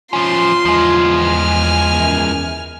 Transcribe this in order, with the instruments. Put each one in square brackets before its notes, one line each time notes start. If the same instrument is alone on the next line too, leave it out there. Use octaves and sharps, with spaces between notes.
[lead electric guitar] F3 C#4 [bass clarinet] F4 [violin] C6
[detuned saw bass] E2 [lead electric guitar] F3 G#3
[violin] G#5 F6
[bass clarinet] F#2